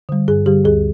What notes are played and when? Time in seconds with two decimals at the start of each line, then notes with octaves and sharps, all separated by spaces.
0.09 D3 G3
0.28 G2 G#4
0.46 D3 G3 G4
0.64 D2 G#4